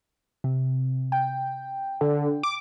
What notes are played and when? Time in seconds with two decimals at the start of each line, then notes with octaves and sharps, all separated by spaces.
0.44 C3
1.12 G5
2.01 D3
2.43 D6